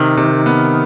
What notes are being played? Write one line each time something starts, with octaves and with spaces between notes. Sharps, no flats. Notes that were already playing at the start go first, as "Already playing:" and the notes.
Already playing: C3 D#3
C3
B3